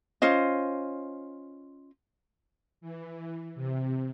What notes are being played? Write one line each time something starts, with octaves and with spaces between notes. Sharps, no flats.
C#4 F4 C5 D#5
E3
C3